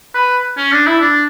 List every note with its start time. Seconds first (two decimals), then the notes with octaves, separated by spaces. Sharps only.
0.14 B4
0.57 C#4
0.72 D4
0.86 E4
1.01 D4